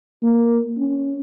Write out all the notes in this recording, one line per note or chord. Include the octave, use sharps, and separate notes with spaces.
A#3
C#4